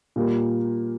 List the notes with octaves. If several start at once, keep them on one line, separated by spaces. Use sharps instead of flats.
A#2 G3 A#3